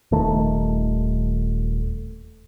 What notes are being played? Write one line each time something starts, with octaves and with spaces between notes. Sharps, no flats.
D#1 D#3 A3